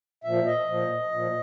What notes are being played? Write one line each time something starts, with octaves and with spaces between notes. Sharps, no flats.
A#2 F3 E5
D#5
A#2 F3
A#2 F3